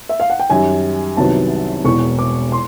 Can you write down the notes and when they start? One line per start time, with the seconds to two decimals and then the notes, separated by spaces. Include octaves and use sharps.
0.09 E5
0.20 F5
0.30 F#5
0.39 G5
0.50 F#2 D#3 G3 G#5
1.17 C2 C3 D#3 F#3 B3 A5
1.85 E1 E2 B2 C#6
2.19 D6
2.52 C6